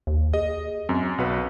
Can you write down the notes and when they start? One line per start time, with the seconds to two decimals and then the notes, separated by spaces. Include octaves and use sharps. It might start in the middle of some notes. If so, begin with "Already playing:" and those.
0.07 D#2
0.33 G#4 D#5
0.89 F#2 C4
1.18 B1 F#4 B4